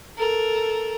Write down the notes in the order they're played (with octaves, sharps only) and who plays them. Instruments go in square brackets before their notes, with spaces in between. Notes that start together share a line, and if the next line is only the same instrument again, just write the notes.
[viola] A4 [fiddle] A#4